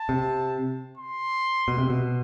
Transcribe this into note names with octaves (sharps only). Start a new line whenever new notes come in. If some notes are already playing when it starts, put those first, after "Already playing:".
Already playing: A5
C3
C6
B2
C3
B2